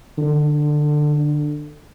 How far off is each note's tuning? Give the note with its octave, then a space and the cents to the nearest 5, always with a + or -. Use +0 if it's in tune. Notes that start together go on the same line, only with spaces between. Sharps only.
D3 +20